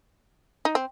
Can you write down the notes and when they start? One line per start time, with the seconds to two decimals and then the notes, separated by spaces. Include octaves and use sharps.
0.65 D#4
0.75 C4